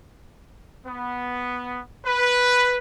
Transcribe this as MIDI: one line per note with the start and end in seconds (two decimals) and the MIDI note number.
0.87 1.80 59
2.06 2.78 71